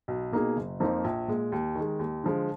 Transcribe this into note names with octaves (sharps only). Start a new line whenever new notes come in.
B1
B2 A#3 D#4 G#4
F#1
F2 F3 A#3 D#4
A#1
A#2 G#3
D#2
D#3
G#3
D#2
D3 F3 G#3